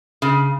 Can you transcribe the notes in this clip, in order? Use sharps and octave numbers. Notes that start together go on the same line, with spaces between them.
C#3